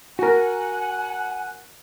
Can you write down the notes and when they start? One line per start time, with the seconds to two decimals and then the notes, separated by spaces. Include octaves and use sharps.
0.19 F#4 A#4 F#5 G#5